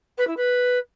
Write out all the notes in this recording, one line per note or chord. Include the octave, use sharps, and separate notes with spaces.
B4
E4
B4